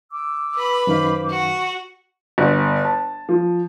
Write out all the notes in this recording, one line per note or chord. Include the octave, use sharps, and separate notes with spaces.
D6 E6
B4 B5
F#2 D#3 C5 F5 D6
F#4 C#6
G1
A5
F3